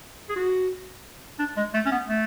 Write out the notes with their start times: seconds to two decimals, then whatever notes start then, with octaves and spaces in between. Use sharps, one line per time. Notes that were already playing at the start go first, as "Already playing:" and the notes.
0.29 G#4
0.36 F#4
1.39 D4
1.57 G#3
1.74 A3
1.86 C#4
1.92 B3
2.09 A3